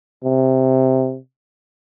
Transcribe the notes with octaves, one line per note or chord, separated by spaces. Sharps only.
C3